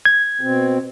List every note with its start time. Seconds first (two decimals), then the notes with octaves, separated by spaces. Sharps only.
0.05 G#6
0.41 B2 C4